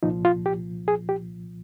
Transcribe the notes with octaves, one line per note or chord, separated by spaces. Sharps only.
C2 A#2 F3 D#4
F4
G4
G#4
G4